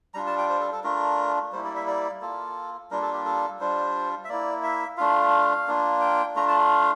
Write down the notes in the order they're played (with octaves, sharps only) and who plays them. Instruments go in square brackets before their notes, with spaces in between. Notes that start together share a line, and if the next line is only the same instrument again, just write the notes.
[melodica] G3 D4 F4 A#5
A5
G5
C5
A4
A4
A3 D4 F4 A#4
G3 A#3 E4 C5
D5
E5
D5
A#3 F4 A4
G3 A#3 D4 F4 A#4
A4
G4
A4
G3 D4 F4 C5
E5
A#3 E4 D5
E5
A3 D4 F4 F5
A#3 D4 F4
G5
A3 D4 F4 A#5
A5
F5